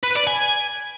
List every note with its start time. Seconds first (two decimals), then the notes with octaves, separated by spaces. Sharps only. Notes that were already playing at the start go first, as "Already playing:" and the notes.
0.04 B4
0.15 D5
0.27 G#5